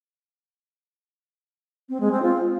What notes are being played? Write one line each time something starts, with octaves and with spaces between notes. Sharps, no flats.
C4
G#3
C4
F4